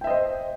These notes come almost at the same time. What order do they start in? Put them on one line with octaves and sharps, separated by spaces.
G5 E5 D#5 C5